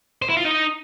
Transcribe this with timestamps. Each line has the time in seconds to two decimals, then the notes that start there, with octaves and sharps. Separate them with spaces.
0.22 C5
0.29 E4
0.37 F4
0.44 D#4